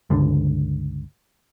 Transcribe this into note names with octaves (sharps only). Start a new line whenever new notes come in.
G1 C#2 D3